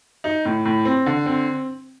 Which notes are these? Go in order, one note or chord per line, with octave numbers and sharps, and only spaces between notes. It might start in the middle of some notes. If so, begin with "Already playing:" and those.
D#4
A2
A2
C4
D3
C4